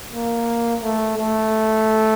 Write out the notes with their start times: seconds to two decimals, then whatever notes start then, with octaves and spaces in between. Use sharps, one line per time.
0.11 A#3
0.82 A3
1.18 A3